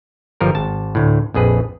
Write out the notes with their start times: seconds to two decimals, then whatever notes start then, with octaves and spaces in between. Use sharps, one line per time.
0.41 G1 F3 G3 A#4
0.55 G#1 A5
0.95 D2 A2
1.34 A#1 F2 G#4 B4